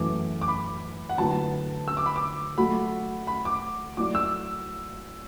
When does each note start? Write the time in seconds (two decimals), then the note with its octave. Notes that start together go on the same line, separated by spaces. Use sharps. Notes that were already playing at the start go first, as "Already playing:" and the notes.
Already playing: F#2 E3 A3 F#4 D6
0.41 D6
0.48 B5
1.09 F#5
1.18 D3 F#3 A3 E4 B4 A5
1.88 E6
1.97 D6
2.06 B5
2.16 D6
2.58 F#3 A3 F#4 B5
3.27 B5
3.45 D6
3.97 F#3 A3 E4 D5 D6
4.15 E6